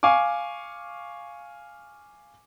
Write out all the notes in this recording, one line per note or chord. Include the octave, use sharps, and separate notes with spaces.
F5 G#5 C#6 D6